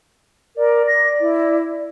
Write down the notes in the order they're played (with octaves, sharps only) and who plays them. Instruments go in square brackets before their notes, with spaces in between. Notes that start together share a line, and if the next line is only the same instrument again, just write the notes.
[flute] A#4 [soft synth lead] D5
[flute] A#6
E4